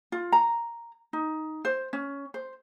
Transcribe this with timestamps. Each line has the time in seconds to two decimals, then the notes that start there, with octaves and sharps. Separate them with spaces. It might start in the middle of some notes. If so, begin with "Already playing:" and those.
0.12 F4
0.32 A#5
1.13 D#4
1.65 C5
1.93 C#4
2.34 C5